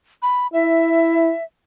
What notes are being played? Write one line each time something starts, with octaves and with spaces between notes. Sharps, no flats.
B5
E4 E5